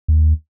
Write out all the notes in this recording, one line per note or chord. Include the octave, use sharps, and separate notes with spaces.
D#2